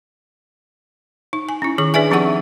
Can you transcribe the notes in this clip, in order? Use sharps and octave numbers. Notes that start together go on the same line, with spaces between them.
D#4
G#5
C#4 E4
D#3 G#4 C#6
D4 G#4 B4 D5 E5 G#5
F3 C4 D#4 G4 F#5 C#6